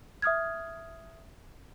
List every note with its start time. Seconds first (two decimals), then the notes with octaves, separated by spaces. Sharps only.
0.22 E5 D#6 F6 G#6